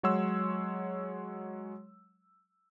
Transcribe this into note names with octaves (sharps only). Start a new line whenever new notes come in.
F#3 G#3 C#5 F#5 C6 E6